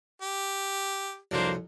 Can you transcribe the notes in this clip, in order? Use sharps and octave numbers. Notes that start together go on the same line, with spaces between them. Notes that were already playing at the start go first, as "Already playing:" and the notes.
G4
C2 F2 F#3 A#3 D4 C5